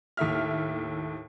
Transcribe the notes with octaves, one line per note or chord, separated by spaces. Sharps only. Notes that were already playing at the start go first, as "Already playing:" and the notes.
D#2 A2 E5 F6